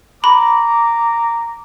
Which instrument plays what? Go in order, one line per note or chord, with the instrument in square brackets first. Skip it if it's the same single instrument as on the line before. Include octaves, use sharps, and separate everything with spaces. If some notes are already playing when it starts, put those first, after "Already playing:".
[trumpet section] A#5 D6 [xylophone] B5